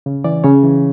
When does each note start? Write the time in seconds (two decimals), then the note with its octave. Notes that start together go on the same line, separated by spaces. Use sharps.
0.06 C#3
0.24 E3 D5
0.44 C#3 C#5
0.63 E3